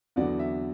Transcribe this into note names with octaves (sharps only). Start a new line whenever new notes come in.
E2 D3 F#3 B3 D5
E5